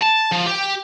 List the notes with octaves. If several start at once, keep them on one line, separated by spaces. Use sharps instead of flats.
A5
F3
G4